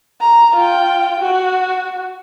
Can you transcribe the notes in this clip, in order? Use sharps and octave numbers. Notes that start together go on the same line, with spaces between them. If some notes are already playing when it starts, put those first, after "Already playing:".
A#5
F4 G5
F#4